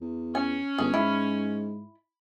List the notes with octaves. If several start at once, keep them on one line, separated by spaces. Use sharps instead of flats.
E2
C#4 G#5
G1 G#4
G#2 E4